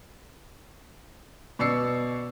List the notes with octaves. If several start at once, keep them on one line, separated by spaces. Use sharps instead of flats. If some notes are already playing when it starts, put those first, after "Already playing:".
B2 D5 E6 C7 C#7